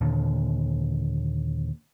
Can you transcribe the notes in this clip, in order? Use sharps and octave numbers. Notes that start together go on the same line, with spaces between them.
D#2 A#2 D3